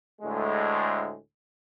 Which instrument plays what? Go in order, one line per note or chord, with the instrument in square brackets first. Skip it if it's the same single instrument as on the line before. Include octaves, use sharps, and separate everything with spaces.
[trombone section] D2 A2 G#3